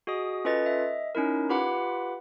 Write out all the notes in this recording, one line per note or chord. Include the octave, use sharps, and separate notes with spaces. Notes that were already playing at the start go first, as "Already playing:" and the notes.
F#4 G#4 D#5 D#6
C#4 F4 A4 B4 D#5 A6
D#5 E5
C#4 D#4 E4 A#4
F4 G4 B4 F#5 B5 D6